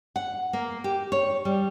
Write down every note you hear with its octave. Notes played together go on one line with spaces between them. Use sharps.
F#5
A#3
G4
C#5
G3